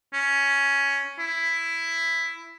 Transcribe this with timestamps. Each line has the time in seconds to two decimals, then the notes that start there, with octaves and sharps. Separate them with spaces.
0.13 C#4
1.19 E4